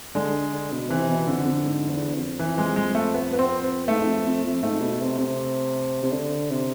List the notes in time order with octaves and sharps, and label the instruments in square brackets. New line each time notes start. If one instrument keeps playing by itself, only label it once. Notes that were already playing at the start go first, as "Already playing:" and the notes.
[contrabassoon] D3 [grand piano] G#3
[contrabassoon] D3
B2
[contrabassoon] C3 [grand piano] E3
[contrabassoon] B2
[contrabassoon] F2 [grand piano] D3
[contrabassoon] F2
G#2
E2
F2
[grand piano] E3
G#3
G#3
A3
B3
B3
C4
B3
[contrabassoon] G#2 [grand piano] A3
[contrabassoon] G#2
F2
F2
F2
[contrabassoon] G#2 [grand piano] A3
[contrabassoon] B2
C3
C3
C3
D3
C3